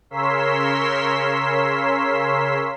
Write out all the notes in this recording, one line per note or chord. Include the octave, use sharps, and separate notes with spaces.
C#3 A#4 C#5 C6 E6 B6